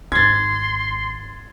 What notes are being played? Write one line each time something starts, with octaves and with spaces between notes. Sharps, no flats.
G#1 D#4 C6 G#6 A6